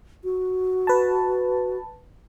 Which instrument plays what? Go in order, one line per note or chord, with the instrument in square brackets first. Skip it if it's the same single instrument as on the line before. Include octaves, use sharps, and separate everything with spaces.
[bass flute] F#4
[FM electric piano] B4 A5